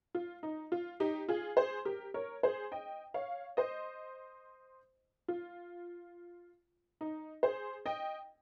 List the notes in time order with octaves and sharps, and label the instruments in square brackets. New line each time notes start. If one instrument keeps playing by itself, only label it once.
[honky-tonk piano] F4
D#4
F4
D#4 G4
F4 G#4
G#4 C5
G4 A#4
A#4 C#5
G#4 C5
D#5 G5
C#5 F5
C5 D#5
F4
D#4
G#4 C5
D#5 G5